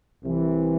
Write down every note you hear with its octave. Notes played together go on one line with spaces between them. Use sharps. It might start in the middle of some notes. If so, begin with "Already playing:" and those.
C2 C3 E3